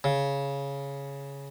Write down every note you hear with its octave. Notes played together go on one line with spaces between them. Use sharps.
C#3